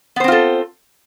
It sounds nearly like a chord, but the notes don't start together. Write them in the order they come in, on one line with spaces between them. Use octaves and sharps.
B3 C5 C4 F4 A4